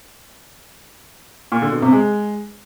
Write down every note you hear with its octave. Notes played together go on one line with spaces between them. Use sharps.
A#2
D3
B2
C3
G#3